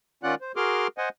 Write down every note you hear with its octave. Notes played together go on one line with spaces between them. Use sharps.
D#3 C#4 F4 D5 F#5 F#6
C5
F#4 G#4 A#4 C6 D6 F6
C5 D#5 F#5 G#5